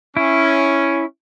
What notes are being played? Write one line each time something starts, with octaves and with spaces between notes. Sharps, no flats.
C#4 E4